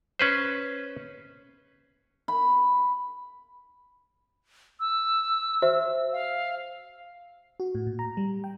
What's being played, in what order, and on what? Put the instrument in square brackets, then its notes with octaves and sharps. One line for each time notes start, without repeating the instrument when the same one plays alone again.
[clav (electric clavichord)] C#4 B4 C5
[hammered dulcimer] B5
[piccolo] E6
[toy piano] F#4 C5 E5
[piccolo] F5
[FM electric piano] F#4
A2
A#2
A#5
G3
G5